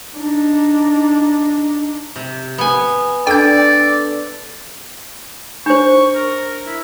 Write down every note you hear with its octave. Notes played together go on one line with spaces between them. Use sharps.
D4 D#4
C3
B3 G#5
D4 A4 D5 G5 G6
D4 C5 C#6
A#4
E4